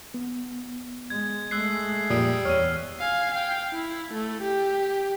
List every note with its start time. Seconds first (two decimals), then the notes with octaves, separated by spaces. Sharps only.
0.14 B3
1.10 G#3 G#6
1.51 G#3 A3 E6 F#6 C7
2.10 F2 A#2 G3 D#6
2.45 E2 C#5 F6 D#7
3.00 F5 G#5
3.31 F5 G5
3.73 E4
4.13 A3
4.42 G4